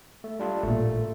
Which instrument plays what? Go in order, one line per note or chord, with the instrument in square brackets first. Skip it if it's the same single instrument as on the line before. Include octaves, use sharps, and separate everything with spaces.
[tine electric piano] A3
G3 D4 F4
[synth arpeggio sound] A1 A#2 [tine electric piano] A3